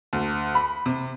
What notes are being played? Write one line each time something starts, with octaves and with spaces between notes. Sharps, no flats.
D2
B5
C3